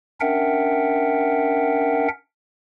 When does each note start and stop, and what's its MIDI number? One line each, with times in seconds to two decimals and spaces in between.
0.21 2.08 61
0.21 2.08 62
0.21 2.08 70
0.21 2.08 76
0.21 2.08 78
0.21 2.08 79